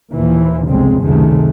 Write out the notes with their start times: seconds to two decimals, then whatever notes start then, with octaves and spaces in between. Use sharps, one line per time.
0.13 D#2 A#2 E3 F3
0.67 G1 C2 F2 C#3 G#3 C4
1.01 C#2 F#2 C3 D#3 G#3 A3